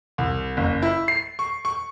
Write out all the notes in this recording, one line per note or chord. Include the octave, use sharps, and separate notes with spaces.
C2
F#1
E4
C7
C#6
C#6